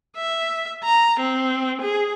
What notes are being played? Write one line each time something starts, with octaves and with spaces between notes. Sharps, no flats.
E5
A#5
C4
G#4